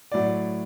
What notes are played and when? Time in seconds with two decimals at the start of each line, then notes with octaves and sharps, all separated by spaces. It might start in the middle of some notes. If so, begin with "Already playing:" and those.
0.12 A2 F#3 D5